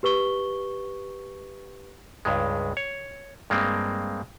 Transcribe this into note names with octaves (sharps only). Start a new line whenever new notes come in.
G4 B4 C#6 G7
C#2 G2 G#3
C#5
G2 G#3 A#3 C4